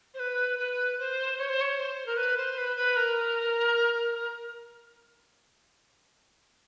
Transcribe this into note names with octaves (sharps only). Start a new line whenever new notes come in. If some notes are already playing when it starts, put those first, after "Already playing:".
C5
B4
B4
C5
C#5
C5
C#5
C5
A#4
B4
C5
B4
B4
A#4